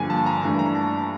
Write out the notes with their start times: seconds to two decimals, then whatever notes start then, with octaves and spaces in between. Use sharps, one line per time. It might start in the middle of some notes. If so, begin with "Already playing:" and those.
Already playing: G2 D3 F3 A#3 G#5
0.10 A5
0.26 A#5
0.43 G2 E3 A3 D4
0.59 A#5
0.75 A5